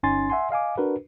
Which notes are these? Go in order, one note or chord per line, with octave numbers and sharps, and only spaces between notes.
G1 C#4 D#4 G#5 C6 A6
E5 F#5 G#5 C6
D#5 F5 G#5 D6
D4 F#4 A#4 B4